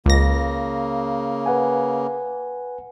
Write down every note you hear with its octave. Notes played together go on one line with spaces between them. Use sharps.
C#2 C#3 A#3 A#6
B4 F#5 G#5